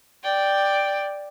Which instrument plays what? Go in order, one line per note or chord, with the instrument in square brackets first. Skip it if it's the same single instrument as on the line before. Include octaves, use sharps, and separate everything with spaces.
[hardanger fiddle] D5 G5